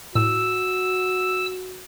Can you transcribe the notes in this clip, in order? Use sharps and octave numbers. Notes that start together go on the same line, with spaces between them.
A2 F#4 E6